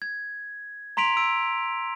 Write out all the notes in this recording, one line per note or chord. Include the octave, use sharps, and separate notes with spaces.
G#6
A#5 C6 B6 D7 F7
E6 D7